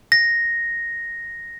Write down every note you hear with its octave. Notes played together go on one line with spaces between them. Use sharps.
A#6